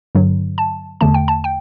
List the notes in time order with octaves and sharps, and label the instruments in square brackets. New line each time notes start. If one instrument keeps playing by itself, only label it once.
[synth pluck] G2 D3 F#3
A5
E2 D3 A3 A5
G5
A5
G5